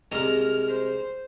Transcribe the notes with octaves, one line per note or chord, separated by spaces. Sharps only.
C2 G#3 A#5 F6
C5